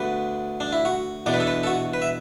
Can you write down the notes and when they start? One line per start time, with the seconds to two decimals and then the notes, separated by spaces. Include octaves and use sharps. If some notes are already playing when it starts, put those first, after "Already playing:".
Already playing: D2 D3 B3 D4 B4
0.60 D4
0.73 E4
0.85 F#4
1.26 E2 B2 B3 D4 D5
1.34 B4
1.40 A4
1.47 B4
1.63 A4
1.67 F#4
1.94 B4
2.02 E5